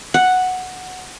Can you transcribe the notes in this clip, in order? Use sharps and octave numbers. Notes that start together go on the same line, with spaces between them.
F#5